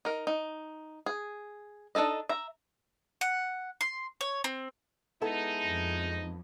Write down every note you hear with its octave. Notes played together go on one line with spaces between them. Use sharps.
D#4 A#4
D#4
G#4
D4 D#4 A4 D#5
E5 A#5
F#5
C6
C#5
C4
G#3 B3 D#4 E4 A4
F2